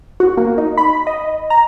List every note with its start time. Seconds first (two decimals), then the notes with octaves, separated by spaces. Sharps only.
0.20 F#4
0.37 A#3
0.58 D#4
0.78 B5
1.07 D#5
1.50 A#5